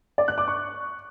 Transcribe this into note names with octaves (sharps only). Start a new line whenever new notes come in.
D5
F#6
D6
C#6